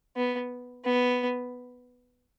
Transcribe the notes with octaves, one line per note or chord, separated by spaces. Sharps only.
B3
B3